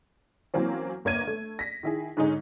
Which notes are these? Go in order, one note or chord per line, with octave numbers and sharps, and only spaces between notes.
E3 F#3 A#3 C4 C#4
G1 A#3 C#5 G#6 D#7
A3
A#6 B6
D#3 E4 G#4
G#2 D3 G#3 C#4 D#4